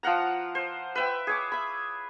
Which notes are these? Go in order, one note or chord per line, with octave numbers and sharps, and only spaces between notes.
F3 F5 F#5 A#5
C5
B4 E5 G5
G#4 C#5 D6
E5 B5